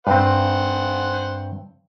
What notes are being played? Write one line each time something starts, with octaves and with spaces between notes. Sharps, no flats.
G2 C4 C5 F#5